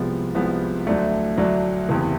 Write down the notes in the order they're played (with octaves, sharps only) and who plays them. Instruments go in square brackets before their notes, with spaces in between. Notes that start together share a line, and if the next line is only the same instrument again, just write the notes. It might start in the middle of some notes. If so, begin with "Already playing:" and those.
Already playing: [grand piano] C2 C3 F3 G#3 B3
C2 C3 F3 G#3 B3
D2 D3 F#3 A3 D4
D2 D3 F#3 A3 D4
F#1 E2 C3